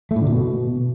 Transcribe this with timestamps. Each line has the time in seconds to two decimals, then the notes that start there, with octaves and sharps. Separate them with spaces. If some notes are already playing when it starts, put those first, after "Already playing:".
0.11 A3
0.16 A2
0.21 D3
0.27 A#2
0.32 B2